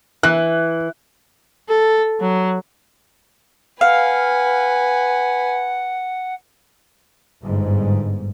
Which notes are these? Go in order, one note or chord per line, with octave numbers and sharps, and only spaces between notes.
E3 F#6
A4
F#3
B4 F5 F#5 G#5
G1 G#2